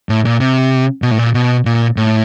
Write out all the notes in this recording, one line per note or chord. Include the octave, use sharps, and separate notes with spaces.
A2
A#2
C3
B2
A2
A#2
B2
A#2
A2